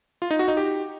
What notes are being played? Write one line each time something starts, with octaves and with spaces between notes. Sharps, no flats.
F4
D#4
F#4
D#4
G4